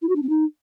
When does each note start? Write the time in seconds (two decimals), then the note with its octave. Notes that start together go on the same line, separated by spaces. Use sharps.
0.02 E4
0.09 F#4
0.15 D4
0.22 C4
0.29 D#4